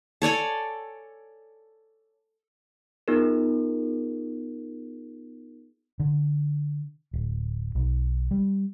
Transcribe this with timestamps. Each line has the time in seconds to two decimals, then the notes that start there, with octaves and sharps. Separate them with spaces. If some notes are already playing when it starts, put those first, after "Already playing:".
0.22 A4 C#5 D5 G#5
3.08 B3 D#4 F4 G#4 A#4
6.00 D3
7.13 D1
7.75 B1
8.31 G3